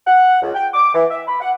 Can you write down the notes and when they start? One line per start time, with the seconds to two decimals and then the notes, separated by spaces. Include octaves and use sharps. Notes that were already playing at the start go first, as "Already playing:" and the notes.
0.06 F#5
0.42 C#2
0.54 G5
0.73 D6
0.93 E3
1.11 E5
1.27 B5
1.40 F#5